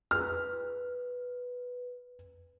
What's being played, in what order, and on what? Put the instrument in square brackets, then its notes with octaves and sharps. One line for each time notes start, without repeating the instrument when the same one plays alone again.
[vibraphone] B4 [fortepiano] F6